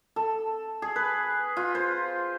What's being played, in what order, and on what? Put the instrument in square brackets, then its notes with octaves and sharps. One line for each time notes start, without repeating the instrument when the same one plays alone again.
[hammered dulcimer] A4
G#4
B4
F4
C5